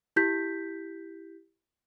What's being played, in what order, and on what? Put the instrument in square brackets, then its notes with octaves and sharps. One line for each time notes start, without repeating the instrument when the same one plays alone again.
[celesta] E4 G4 G6 B6